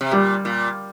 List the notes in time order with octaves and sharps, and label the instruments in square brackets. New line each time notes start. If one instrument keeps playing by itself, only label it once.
[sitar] C3
[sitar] A#2 [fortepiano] G3
[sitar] A#2